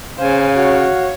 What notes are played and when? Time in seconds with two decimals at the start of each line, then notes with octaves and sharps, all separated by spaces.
0.18 C#3 C5 F5 G#5
0.53 F#4 C#5